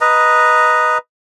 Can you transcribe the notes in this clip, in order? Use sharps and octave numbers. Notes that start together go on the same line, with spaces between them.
B4 D#5 A#5